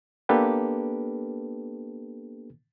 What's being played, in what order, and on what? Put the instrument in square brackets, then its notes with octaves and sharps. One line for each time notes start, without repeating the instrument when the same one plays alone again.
[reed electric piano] A#3 B3 D4 G4 A4 B4